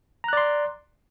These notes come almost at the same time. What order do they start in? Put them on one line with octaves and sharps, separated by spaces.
A#5 F#6 D5 C6